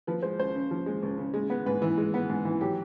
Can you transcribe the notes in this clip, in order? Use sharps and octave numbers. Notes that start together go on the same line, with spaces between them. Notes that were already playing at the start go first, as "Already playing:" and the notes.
F3 B4
G#3 C5
C#2 C5
C#3
F3
G#3
C#2
C#3
G#3
B3
G#2 B4
E3
G#3
B3
G#2
E3
F#3 G4